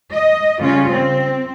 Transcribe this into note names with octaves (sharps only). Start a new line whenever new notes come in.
D#5
C#3 G3 C#4 F4
C4